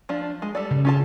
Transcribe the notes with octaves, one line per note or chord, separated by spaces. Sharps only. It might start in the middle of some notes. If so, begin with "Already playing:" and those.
F3 D4 F4
G#3
G3 A4 D5
C#3
C#4 F4 A5